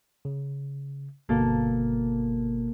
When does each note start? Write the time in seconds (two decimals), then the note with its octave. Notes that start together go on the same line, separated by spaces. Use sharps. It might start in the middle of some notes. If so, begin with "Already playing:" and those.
0.25 C#3
1.29 G1 B2 A#3 A4